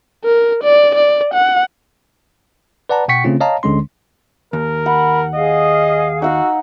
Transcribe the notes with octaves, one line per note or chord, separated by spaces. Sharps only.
A#4
D5
D5
F#5
B4 D5 F#5 A5 A#5
B2 F#5 G5 C#6 B6 C#7
C#3 A3 C4 C#4 F4
C#5 D#5 F5 A5 A#5
D2 D3 G#3 C#4 C6
D#2 A#4
F#5 B5
G#4 D#5 F5
D#4 F#4 F5 F#5 E6